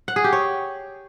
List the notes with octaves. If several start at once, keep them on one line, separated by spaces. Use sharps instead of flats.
F#5
G#4
G4
C#5